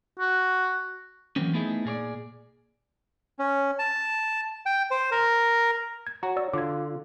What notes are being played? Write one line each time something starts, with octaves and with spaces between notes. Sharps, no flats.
F#4
E3 F#3 A#3 C4 C#4
A3 B3 D#4 E4 G#4
A#2 G#4 C#5 D5
C#4
A5
G5
C5
A#4
G#6
F#4 C#5 A#5
D5 E6
D3 F4 D6 G#6